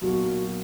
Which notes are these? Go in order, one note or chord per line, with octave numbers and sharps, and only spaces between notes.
B1 A#2 F#3 A#3 F#4